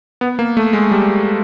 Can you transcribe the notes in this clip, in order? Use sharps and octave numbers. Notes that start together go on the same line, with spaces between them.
B3
A#3
A3
G#3
G3